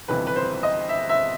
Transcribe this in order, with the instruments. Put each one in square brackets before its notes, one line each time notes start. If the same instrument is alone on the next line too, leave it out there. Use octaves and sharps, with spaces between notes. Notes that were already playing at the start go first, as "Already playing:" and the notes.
[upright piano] G1 F2 C3 E3 B4
B4
C5
D#5
E5
E5